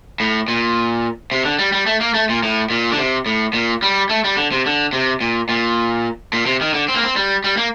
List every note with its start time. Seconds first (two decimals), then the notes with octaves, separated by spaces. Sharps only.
0.20 A2
0.48 A#2
1.32 C3
1.45 D3
1.59 G3
1.72 G3
1.86 A3
2.01 A#3
2.14 A3
2.29 A#2
2.43 A2
2.70 A#2
2.92 D3
2.98 C3
3.26 A2
3.53 A#2
3.82 G3
4.09 A3
4.24 G3
4.37 D3
4.52 C3
4.66 D3
4.93 C3
5.21 A#2
5.49 A#2
6.33 A#2
6.46 C3
6.61 D#3
6.74 D3
6.88 C4
6.96 A#3
7.03 C4
7.16 G3
7.44 G3
7.57 A#3